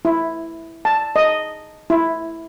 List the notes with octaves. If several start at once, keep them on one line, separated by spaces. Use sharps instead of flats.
E4
A5
D#5
E4